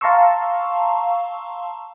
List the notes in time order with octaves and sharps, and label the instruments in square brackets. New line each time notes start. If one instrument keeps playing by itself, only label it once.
[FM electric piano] F5 A5 A#5 C6 C#6 E6